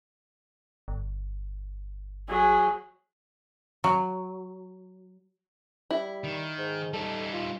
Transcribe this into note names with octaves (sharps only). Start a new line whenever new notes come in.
G1
F#3 G#4
F#3
G3 E4
D#3
G#2
G3 D#4 A4
F4